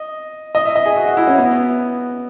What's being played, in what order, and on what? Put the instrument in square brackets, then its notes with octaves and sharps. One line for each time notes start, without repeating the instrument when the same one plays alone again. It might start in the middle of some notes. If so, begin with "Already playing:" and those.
Already playing: [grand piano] D#5
D#5
E5
D#5
G#4
F#4
F#4
E4
C#4
B3